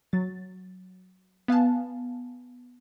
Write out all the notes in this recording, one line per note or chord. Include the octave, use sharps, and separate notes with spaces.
F#3 A6
B3 F5 G#5 A5